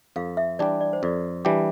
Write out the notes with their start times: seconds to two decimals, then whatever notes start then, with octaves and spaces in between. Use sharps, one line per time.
0.16 F2 F5
0.37 E5
0.59 E3 G3 D4 G4 D5
0.81 D5
0.93 C5
1.03 F2 D5
1.45 E3 G3 D4 G4